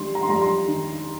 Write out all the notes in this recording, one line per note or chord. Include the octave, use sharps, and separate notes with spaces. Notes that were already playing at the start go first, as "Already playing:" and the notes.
Already playing: D#3 G3 C6
A#5
C6
G3 A#5
C6
D#3